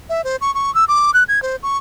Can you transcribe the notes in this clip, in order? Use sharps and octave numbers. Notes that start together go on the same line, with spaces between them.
E5
C5
C#6
C#6
E6
D6
F#6
G#6
C5
C#6